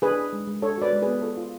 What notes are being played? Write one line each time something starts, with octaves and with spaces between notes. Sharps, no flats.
D4 G#4 B4
D4
G#3
G#3
D4 A4 C#5
F#4 B4 D5
G#3
B3 G#4 B4
F4 A4
F4